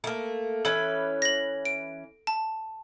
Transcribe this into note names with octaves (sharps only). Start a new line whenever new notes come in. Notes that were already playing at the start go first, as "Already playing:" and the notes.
A3 A#3
E3 C#4 A4 B4
A#6 F#7
D7
A5